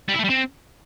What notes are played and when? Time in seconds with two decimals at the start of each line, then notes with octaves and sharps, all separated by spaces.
0.08 G3
0.14 E4
0.19 A3
0.24 G3
0.30 C4